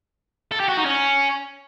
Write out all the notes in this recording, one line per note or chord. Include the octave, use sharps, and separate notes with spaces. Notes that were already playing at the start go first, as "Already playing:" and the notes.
A4
G4
F#4
D#4
C#4